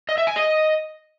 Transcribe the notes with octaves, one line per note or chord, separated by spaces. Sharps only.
D#5
E5
G#5
D#5